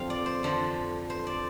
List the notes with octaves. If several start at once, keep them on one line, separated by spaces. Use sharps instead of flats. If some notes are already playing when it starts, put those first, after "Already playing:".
Already playing: F2 D3 F3 F5 G5
D5
C5
F2 D3 F3
C5
D5